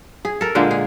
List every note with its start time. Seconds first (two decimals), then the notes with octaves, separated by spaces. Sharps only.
0.25 G#4
0.41 A4 A#4
0.55 A#2 D3 G#3 A#3
0.71 G#4